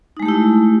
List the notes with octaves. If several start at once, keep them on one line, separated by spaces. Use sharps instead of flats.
G#3 A3 D#4 E4 G4